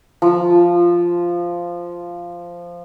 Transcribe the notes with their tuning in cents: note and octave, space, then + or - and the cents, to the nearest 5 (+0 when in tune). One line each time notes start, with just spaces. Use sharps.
F3 -5